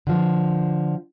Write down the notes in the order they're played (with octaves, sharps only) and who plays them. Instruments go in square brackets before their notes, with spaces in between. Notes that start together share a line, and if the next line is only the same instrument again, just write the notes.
[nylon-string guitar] D3 F3